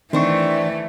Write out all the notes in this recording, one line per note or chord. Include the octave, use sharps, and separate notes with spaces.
D#3 E3 A3 C4 D4 C#6